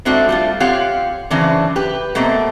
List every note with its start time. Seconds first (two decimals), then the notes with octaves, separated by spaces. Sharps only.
0.05 G#2 A3 C4 D4 F#4
0.29 G3 A3 F4
0.60 C4 F4 G4 C#5 F5 F#5
1.30 F#2 C#3 E3 C4 D4
1.76 G4 B4
2.15 B2 A3 A#3 C4